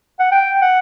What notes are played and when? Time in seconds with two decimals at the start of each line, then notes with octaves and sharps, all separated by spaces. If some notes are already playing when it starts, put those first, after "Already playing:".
0.20 F#5
0.32 G5
0.61 F#5